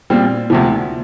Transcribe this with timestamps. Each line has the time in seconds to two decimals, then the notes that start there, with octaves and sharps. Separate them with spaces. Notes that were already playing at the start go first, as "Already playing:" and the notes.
0.10 A#2 G3 C4 F4
0.50 D2 C3 F3